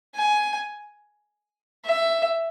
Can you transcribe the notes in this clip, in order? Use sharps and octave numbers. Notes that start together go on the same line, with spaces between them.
G#5
E5